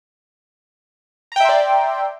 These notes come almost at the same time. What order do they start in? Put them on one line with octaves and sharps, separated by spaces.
A#5 G5 E5 C6 D5